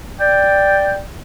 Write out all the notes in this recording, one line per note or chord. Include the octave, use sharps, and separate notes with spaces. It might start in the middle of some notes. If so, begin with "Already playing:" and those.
D5 G5